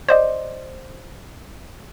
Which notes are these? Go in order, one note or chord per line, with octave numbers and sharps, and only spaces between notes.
C5 D5 D#5